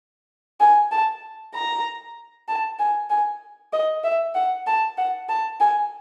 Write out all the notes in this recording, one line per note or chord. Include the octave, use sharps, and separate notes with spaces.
G#5
A5
A#5
A5
G#5
G#5
D#5
E5
F#5
A5
F#5
A5
G#5